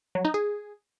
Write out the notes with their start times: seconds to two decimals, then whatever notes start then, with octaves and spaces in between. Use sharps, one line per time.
0.15 F#3
0.25 D#4
0.34 G#4